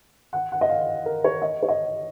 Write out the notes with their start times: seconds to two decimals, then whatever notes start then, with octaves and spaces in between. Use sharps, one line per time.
0.33 F#5
0.52 F#5
0.61 D#5
0.69 F5
1.06 A#4
1.24 C#5
1.42 D#5
1.63 C#5
1.69 D#5